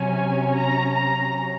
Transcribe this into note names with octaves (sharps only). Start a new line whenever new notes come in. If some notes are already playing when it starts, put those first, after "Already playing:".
Already playing: C3 F#3 C#4 G#5
A#5
A#5